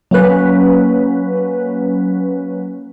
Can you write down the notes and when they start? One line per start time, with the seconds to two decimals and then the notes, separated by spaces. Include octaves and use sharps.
0.11 F#3 A#3 C#4 B4